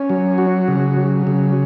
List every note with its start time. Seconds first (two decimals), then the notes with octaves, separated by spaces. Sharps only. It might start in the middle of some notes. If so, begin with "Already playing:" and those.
Already playing: C#4
0.10 F#3
0.38 F#4
0.68 C#3
0.97 F#3
1.27 C#3